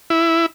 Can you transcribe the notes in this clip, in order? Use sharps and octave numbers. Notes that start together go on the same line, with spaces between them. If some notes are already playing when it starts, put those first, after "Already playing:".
E4